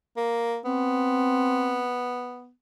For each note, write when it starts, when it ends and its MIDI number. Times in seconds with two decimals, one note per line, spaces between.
0.17 0.58 58
0.65 2.50 59
0.65 1.86 60